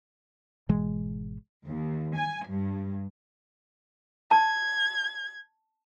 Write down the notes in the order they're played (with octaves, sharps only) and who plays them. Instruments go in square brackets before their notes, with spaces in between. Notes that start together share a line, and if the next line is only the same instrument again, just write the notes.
[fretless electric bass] G#1 B2 E3 G#3
[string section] D#2
G#5
G2
[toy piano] A5 [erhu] G#6